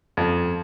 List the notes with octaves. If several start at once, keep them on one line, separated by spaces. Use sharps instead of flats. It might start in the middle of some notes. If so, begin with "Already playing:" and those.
F2